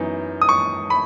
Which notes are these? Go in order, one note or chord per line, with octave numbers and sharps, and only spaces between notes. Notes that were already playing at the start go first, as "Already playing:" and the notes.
Already playing: F#2 E3 B3 D#4
D#6
C#6
B5